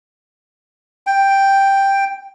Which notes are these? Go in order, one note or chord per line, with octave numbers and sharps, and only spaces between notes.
G5